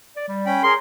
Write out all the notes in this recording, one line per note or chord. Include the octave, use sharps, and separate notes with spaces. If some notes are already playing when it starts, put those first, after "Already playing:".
D5
G3
C#4 G5 B5
G#4 A#4 C6